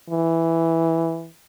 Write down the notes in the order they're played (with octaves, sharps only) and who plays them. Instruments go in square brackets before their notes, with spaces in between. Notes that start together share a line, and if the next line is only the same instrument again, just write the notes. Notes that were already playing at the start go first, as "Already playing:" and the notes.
[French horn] E3